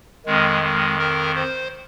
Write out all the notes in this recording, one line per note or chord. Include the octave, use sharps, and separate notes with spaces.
F2 D#3 G#3
G#3
A#4
C5